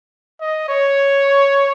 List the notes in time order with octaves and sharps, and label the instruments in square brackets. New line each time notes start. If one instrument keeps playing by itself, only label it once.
[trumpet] D#5
C#5